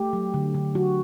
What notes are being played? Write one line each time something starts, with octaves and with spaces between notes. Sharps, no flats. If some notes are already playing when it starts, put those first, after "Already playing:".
Already playing: A3 G4
F#3
D3
D3
F#3 F#4